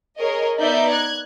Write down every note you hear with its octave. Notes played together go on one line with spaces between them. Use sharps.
G#4 A#4 C#5 D#5
B3 D#4 D5 E5 G6
F#6 G#6